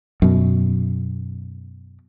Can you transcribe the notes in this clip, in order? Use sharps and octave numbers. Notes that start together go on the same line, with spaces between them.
F#2 B2